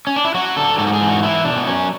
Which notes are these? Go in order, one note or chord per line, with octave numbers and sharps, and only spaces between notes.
C#4
D4
E4
F#3 F#4
D3 A4
G#2 A4
F#4
G#4
E3
F#4
F#3 E4
B2 D4
B3
F#3 C#4